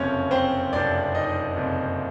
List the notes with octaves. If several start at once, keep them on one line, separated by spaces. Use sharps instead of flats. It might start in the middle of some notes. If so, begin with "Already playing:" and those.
Already playing: F#1 F2 C3 C#4 C#5
C4 C5
F#1 F2 C3 D4 D5
D#4 D#5
F#1 F2 C3